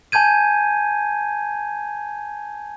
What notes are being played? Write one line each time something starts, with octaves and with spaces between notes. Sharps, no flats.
G#5 A5 G6 G#6 D#7